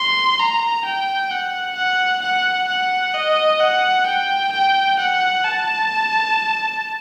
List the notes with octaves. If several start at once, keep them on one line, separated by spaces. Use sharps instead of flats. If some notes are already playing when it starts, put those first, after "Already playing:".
Already playing: C6
A#5
G5
F#5
F#5
F#5
F#5
D#5
F#5
G5
G5
F#5
A5